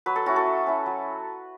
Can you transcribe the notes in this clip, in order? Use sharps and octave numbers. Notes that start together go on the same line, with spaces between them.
F#3 B4
A4
C#4 E4 F#4
A4
F#3
C#4 E4
F#3